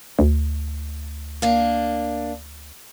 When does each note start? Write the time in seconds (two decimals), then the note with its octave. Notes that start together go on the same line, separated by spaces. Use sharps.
0.19 D2
1.42 A#3 D4